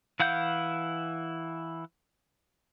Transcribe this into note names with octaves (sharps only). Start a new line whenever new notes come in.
E3 E4 F5 F#5 G6